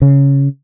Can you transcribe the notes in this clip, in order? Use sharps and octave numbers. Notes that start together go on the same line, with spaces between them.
C#3